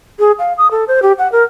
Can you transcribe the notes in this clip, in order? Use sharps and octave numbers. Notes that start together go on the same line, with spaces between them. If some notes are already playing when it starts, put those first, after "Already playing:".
G#4
F5
D#6
A4
C5
G4
F#5
A#4